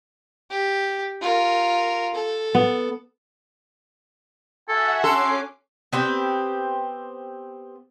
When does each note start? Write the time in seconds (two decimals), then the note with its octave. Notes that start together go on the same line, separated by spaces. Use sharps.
0.51 G4
1.21 F4 A#4
2.14 A4
2.55 B3
4.69 F#4 A4 E5 F#5 G#5
5.04 C#4 A4 C6 D6 C7
5.93 B3 C4 G4 G5